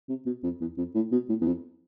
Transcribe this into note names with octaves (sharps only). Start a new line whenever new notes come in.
C3
B2
F2
E2
F2
A2
B2
A2
E2
F2